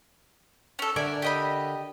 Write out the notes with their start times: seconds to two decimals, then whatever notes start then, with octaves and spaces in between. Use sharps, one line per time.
0.79 C#4 A4
0.96 D3 A#4 D5 E5 G#5
1.22 G4 D#5 B5